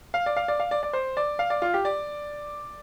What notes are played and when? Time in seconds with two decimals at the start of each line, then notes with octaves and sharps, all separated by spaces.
0.14 F5
0.26 D5
0.36 F5
0.48 D5
0.60 F5
0.71 D5
0.83 D5
0.93 C5
1.17 D5
1.39 F5
1.50 D5
1.62 F4
1.74 G4
1.85 D5